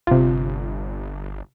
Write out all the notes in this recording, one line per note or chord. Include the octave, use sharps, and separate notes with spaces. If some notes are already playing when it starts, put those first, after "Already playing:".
G1 C3 F4